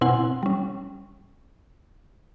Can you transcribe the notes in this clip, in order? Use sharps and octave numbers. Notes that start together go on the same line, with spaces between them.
B2 C4 E4 F#5 G#5 C6
G3 C#4